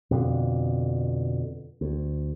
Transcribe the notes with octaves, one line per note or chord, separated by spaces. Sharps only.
F2 B2 D3
D2